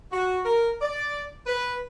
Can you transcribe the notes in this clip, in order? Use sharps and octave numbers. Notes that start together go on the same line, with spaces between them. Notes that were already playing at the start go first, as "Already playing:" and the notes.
F#4
A#4
D5
B4